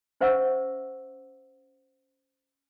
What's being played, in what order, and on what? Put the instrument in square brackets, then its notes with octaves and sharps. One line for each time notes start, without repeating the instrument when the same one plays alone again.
[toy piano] C#4 C5 E5 F#5 C#6 E6